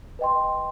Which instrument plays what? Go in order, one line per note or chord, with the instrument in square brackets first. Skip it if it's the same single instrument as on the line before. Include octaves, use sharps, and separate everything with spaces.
[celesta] B4 D#5 G5 C6